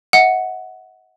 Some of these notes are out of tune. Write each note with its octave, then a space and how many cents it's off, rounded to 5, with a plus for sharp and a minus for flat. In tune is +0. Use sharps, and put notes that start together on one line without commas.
D#5 +45 F#5 +0